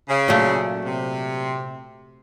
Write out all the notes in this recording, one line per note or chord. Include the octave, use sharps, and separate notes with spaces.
C#3
A#2 F#3 A3
C3